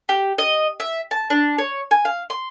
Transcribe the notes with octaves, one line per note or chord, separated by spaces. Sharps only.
G4
D#5
E5
A5
D4
C#5
G#5
F5
C6